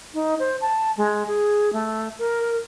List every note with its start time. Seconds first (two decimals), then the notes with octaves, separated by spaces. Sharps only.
0.14 D#4
0.39 C5
0.61 A5
0.97 G#3
1.27 G#4
1.73 A3
2.19 A#4